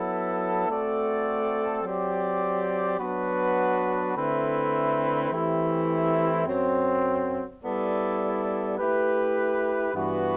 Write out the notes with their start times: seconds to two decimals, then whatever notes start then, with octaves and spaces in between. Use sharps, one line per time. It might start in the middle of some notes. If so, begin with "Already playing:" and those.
Already playing: F#3 B3 E4 A4
0.68 A3 C4 F#4 A4 D5
1.83 F#3 C4 G4 D5
2.99 F#3 B3 D4 F#4 B4
4.15 D3 A3 C4 E4 B4
5.30 E3 A3 C4 E4 G4
6.46 F#2 F#3 C4
7.61 G3 B3 E4 A4 D5
8.77 A3 E4 G4 B4
9.93 G2 E3 B3 F#4 B4